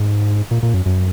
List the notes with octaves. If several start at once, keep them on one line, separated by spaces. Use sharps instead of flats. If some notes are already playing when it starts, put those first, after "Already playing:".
Already playing: G#2
A#2
A#2
F#2
F#2